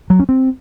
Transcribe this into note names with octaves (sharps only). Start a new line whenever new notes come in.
F#3
C#4
C4